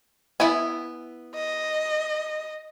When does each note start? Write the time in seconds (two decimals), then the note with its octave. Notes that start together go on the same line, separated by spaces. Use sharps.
0.40 B3 E4 G#5
1.35 D#5